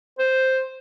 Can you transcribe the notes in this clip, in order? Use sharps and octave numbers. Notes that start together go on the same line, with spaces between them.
C5